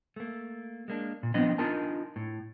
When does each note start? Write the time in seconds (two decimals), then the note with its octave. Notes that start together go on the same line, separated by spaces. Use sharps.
0.16 A3 A#3
0.88 G#3 A#3 D4
1.23 A#2
1.34 F3 B3 C4 D4 D#5
1.58 D4 D#4 F4 A#4 G#5 A5
2.16 A2